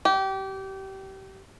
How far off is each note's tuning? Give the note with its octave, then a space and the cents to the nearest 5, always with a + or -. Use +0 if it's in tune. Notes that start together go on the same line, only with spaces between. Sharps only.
G4 -25